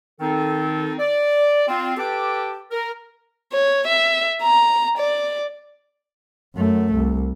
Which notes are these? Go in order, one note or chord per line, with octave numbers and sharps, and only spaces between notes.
D#3 C4 D#4 A4
D5
C4 F4
G4 A4 B4 G5 A5 D6
A#4
C#5
E5
A#5
D5
F#2 A3
C2